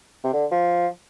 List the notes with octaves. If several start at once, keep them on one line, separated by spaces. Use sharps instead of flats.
C3
D3
F3